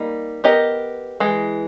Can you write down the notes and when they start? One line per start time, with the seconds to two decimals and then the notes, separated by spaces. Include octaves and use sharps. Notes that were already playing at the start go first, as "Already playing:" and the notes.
Already playing: G3 A#3 D#4
0.44 B3 G4 A#4 D#5
1.20 E3 G#3